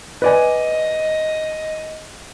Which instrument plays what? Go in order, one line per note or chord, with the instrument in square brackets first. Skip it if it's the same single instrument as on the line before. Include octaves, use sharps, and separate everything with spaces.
[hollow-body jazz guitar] B4 D5 G#5 [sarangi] D#5